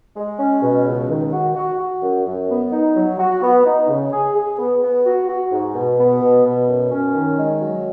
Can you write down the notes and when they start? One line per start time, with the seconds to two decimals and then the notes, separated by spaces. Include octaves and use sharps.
0.16 G#3
0.39 C#4
0.62 B2
0.85 C#2
1.09 D#3
1.32 F#4
1.56 F#4
1.79 F#4
2.02 F#2
2.26 F#2
2.49 B3
2.72 D#4
2.95 F#3
3.19 F#4
3.42 B3
3.65 D#4
3.89 C#3
4.12 G#4
4.35 G#4
4.58 B3
4.82 B3
5.05 F#4
5.28 F#4
5.51 G#2
5.75 B2
5.98 B3
6.21 B2
6.44 B2
6.68 F#2
6.91 C#4
7.14 D#3
7.37 G#3
7.61 F#3